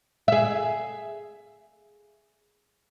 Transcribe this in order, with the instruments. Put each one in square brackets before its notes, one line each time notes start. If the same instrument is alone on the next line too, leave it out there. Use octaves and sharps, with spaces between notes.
[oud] G#4 E5